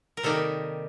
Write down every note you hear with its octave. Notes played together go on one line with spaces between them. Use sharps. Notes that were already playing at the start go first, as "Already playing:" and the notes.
A#4
C3 D#3 G3 A#3 D#4 A4